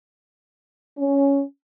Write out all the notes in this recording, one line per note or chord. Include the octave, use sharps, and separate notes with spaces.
C#4